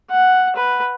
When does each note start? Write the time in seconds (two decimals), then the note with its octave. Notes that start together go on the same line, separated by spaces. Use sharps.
0.10 F#5
0.56 B4